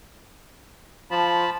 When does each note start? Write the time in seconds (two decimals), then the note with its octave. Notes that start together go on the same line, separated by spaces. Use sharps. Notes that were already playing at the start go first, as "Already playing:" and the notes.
1.11 F3 A5 B5